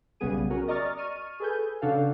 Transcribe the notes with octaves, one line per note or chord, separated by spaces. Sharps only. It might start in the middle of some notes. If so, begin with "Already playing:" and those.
B1 C#3 G3 B3 G#4 D#7
C#4 F#4 A#4
D5 D#5 A#5 C#6 F6 A6
C#6 F6 D#7
G#4 A4 B4 G#5 G6
C#3 D4 F#4 A4 F5